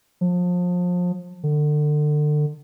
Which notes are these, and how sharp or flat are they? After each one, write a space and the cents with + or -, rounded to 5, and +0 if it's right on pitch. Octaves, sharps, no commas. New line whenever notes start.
F3 +30
D3 +30